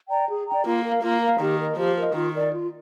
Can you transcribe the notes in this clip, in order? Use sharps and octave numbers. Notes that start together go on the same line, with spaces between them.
D5 G5 A#5
G#4
D5 G5 A#5
A#3 F4
A#4 F5
A#3 F4
A#4 F5
D#3 G4
A#4 D#5
F3 G4
A#4 D#5
D#3 F4
A#4 D5
F4